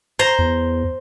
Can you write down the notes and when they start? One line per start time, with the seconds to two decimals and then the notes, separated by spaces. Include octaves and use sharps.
0.19 C5 A#5
0.39 E2